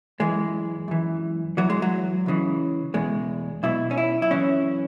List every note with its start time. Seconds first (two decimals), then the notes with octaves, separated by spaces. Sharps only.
0.20 F#2 E3 G#3
0.88 F#2 E3
1.57 E2 E3 F#3
1.70 G#3
1.82 F#3
2.26 C#2 C#3 E3
2.94 E2 B2 G#3
3.63 B1 B2 E4
3.91 C#4
3.97 E4
4.22 E4
4.31 F#2 C#3 E3 C#4